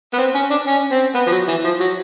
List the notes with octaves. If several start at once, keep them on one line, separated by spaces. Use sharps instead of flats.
B3
C4
C#4
D4
C#4
C4
B3
F3
F#3
E3
F3
F#3